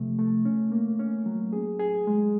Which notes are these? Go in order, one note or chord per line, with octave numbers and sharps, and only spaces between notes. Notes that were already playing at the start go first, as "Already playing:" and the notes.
Already playing: C3 F3 A3
A3
C#4
A#3
C#4
F#3
G#4
G#4
G#3